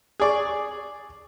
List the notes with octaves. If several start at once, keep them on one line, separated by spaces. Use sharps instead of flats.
G#4 D5 C#6